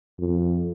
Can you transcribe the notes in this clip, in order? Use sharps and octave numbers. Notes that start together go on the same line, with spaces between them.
F2